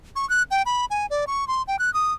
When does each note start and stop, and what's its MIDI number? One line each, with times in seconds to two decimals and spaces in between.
0.16 0.28 85
0.29 0.43 90
0.51 0.62 79
0.66 0.85 83
0.90 1.06 80
1.10 1.25 74
1.27 1.47 85
1.48 1.62 84
1.68 1.79 79
1.79 1.93 90
1.94 2.13 87